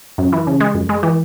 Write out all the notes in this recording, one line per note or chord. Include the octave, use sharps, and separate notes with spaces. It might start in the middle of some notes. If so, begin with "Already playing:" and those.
F#2
E3
C#3
G#3
F#2
G#3
E3